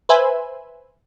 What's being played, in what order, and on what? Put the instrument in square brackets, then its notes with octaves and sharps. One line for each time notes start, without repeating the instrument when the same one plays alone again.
[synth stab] B4 C5 E5 G#5